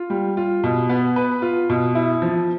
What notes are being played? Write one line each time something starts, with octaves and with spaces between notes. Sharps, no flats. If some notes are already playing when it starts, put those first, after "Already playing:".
Already playing: F4
G3
F4
B2
B3
B4
F4
B2
E4
F3